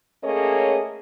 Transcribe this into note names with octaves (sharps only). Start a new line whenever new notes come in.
A3 A#3 C#4 G#4 C#5 D#5